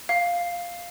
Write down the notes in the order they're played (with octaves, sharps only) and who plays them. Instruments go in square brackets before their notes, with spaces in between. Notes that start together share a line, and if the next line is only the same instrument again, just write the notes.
[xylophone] F5